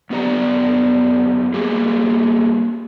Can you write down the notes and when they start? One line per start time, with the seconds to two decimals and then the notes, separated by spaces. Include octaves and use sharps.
0.10 F#2 B3 G4 D5 A#5
1.54 G3 A#3 G4 G#4